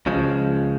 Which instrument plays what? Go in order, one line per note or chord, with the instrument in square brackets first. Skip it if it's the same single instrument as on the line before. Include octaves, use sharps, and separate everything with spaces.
[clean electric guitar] C#2 C#3 F3 G#3